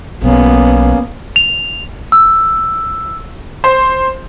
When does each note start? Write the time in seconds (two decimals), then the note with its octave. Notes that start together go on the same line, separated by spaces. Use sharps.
0.24 B1 A#3 B3 C#4
1.36 F7
2.12 E6
3.64 C5